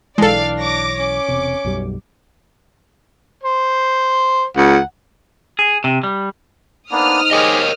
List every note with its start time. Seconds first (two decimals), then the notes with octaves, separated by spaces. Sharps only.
0.18 B1 E3 G#3 D4 A4 D5 F5
0.59 C#5 D6 A#6
0.99 C#4 D6
1.28 E1 C3
1.64 B1 F#2 G3
3.43 C5
4.57 C#2 F#5
5.59 G#4
5.84 C3
6.03 G3
6.91 A#3 B3 D4 D#4 C5 D#6 F6
7.31 G#3 G4 G#4 A#4 C#5 D#5